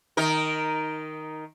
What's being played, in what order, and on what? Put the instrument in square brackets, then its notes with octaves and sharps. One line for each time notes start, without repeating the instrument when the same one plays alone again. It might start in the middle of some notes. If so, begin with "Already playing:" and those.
[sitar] D#3 D#4 A#4